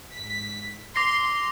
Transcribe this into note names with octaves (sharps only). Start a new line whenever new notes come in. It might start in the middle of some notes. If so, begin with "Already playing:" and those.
G#2 B6
C6 D6 A#6 C7